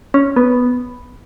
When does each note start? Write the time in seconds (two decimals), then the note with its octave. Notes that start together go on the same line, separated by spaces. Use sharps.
0.14 C#4
0.36 B3